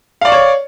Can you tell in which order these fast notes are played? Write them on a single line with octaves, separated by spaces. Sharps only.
F5 D5 C#6 C#5